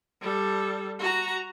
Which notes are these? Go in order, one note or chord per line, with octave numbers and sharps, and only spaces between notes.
G3 A4
F#4 A#5